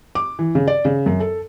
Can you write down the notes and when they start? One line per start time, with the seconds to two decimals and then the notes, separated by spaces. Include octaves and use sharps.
0.15 D6
0.39 E3
0.55 C#3
0.68 D5
0.85 C#3
1.06 F#2
1.20 A4